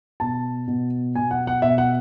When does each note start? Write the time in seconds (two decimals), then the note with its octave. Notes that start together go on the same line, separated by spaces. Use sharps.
0.20 B2 A5
0.68 B2
1.15 B2 G#5
1.31 F#5
1.47 F#5
1.62 B2 E5
1.78 F#5